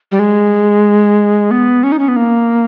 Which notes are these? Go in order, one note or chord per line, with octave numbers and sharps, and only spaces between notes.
G3
G#3
B3
C#4
D#4
C#4
B3
A#3